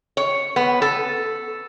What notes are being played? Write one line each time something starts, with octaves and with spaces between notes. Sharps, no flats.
C#5
B3
A4